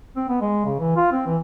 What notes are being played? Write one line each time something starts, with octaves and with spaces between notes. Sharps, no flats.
C4
B3
G#3
C#3
E3
F4
C4
E3